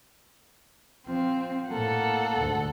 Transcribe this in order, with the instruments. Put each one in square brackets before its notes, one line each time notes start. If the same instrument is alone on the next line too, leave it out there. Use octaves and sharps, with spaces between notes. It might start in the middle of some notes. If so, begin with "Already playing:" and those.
[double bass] F3 [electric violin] C4
[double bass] A2 A#3 [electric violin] A4 F#5
[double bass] D2 G#2